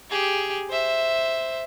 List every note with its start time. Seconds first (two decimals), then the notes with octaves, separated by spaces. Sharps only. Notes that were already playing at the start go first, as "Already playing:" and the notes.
0.10 G4 G#4
0.70 C5 E5